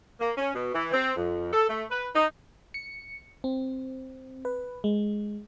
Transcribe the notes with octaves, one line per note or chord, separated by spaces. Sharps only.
A#3
C#4
B2
E3
C4
F2
A4
A3
B4
D#4
C#7
C4
B4
G#3